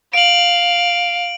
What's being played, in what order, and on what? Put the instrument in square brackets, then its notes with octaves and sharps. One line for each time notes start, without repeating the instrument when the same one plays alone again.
[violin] F5 [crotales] D7 F#7